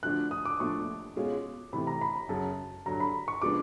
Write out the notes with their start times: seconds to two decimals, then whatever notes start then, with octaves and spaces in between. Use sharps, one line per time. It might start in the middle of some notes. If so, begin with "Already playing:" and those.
0.03 D3 F3 A3 D4 F#4 F#6
0.31 D#6
0.45 D6
0.59 A#2 F3 A3 D4 C#6
1.16 B2 G#3 C#4 F4 G#4
1.73 C3 E3 A3 B5
1.87 A#5
2.01 B5
2.16 A#5
2.29 F#2 C#3 F#3 A5
2.86 G2 D3 F#3 A#5
3.00 B5
3.28 C#6
3.42 C#3 F3 G#3 B3 D4 D6